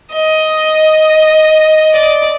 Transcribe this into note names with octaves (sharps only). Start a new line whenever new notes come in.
D#5
D5